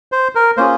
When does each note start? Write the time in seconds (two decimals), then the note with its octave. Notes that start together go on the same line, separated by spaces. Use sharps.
0.12 C5
0.35 A#4
0.57 A#3 C#4 F4 G#4 C5